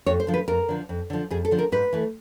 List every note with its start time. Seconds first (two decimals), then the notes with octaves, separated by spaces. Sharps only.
0.06 F2 C#5
0.20 C5
0.27 D3 F3
0.34 B4
0.48 F2 A#4
0.69 D3 F3
0.89 F2
1.10 D3 F3
1.31 F2 G#4
1.45 A4
1.51 D3 F3
1.59 A#4
1.72 G#2 B4
1.93 E3 A3